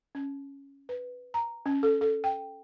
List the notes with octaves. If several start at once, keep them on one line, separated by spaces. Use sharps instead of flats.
C#4
B4
A#5
C#4
A4
A4
G5